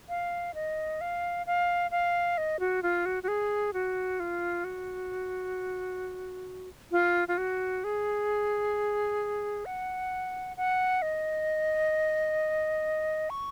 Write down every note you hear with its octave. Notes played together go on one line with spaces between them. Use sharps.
F5
D#5
F5
F5
F5
D#5
F#4
F4
F#4
F#4
G#4
F#4
F4
F#4
F4
F4
F#4
G#4
F#5
F#5
D#5
C#6